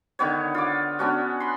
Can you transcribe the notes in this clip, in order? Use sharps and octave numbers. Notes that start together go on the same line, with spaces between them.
D3 D#3 B3 C#5
F4 D6
B3 C#4 D4 F#4
B5 C6